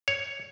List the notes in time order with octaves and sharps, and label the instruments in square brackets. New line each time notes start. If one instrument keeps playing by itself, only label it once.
[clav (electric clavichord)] C#5